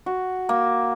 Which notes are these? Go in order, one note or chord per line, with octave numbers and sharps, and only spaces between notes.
F#4
A#3